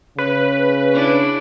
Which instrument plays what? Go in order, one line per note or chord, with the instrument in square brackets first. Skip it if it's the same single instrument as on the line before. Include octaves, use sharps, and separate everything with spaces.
[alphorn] C#3 [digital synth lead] B4
[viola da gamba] D4 E4